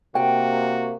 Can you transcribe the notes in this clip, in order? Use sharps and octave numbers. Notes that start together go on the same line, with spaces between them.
C3 A#3 F#4 G5